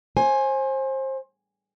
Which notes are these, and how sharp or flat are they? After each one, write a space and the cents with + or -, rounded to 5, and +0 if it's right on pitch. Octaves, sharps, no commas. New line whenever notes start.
C5 +30 G#5 +0